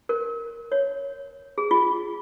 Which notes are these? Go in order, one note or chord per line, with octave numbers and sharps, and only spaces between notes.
A#4
C#5
G#4
F4